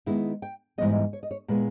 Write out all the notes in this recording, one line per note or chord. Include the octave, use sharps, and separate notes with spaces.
D#3 G#3 B3 E4
G5
G#2 E3 G3 B3 D#5
C#5
D#5
C#5
A#2 G#3 B3 E4 B4